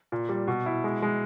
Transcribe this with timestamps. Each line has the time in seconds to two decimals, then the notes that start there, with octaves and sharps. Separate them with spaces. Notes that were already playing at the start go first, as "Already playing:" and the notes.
0.12 A#2
0.29 G3
0.48 B2
0.66 E4
0.84 G#3
1.02 G#3